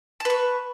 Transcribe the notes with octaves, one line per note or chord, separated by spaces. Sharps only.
B4 A5 C#6